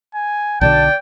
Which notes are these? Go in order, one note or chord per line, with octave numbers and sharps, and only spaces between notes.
G#5
B1 B2 D3 D5 G5 A5